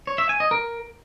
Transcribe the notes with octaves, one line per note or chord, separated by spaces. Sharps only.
C#5
E5
G#5
D#5
A#4